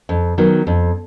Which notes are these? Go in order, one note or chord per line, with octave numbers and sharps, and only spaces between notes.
F2
D#3 F#3 B3
F2